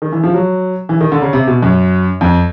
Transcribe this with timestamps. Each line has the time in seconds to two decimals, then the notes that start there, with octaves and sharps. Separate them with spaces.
0.02 D#3
0.12 E3
0.23 F3
0.34 F#3
0.89 E3
1.01 D#3
1.12 D3
1.22 C#3
1.33 C3
1.47 B2
1.63 F#2
2.21 F2